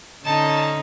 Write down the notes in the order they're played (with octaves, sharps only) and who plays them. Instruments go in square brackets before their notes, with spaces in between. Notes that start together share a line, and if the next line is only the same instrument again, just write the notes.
[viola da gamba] D3 C#4 D#4 [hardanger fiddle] A5